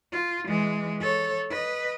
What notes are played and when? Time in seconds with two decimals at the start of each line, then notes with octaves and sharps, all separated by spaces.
0.12 F4
0.46 E3 G#3
1.00 A4 C#5
1.50 B4 D#5